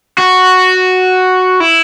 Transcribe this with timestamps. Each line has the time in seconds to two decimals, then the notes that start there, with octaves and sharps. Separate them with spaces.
0.18 F#4
1.60 E4